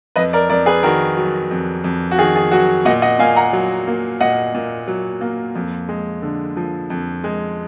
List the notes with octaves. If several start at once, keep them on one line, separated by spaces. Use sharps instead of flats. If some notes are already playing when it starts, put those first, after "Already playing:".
F2 B4 D#5
A#4 D5
F2 A#4 D5
G#4 B4
D#3 F#4 A#4
F#3
F2
F2
F#4
D#3 G#4
G#4
F#3 F#4
A#2 D#5 F#5
D#5 F#5
A#2 F5 G#5
F#5 A#5
F#3
A#3
A#2 D#5 F#5
A#2
F#3
A#3
F2
G#3
D3
F3
F2
G#3